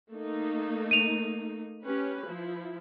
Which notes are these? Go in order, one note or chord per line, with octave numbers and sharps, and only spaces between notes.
A3 A#3 D#4
D#7 F7
C#4 G4 B4
F3 E4